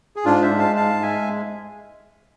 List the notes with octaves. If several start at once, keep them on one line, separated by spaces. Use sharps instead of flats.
G#4
G#2 D4 F4
C5 E5
G#3
F5 A5
G#2 F5 A5
G#3 E5 G#5